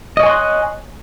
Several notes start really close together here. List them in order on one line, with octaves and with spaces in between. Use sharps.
D#5 C#5 G#5 C6 F#6